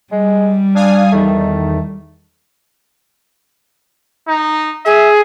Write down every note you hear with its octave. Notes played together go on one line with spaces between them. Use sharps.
G3 G#3
D4 F5 G#5 D#6
E2 D#3 A3
D#4
G#4 E5